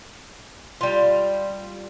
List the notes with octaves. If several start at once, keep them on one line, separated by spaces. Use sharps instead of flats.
G3 F4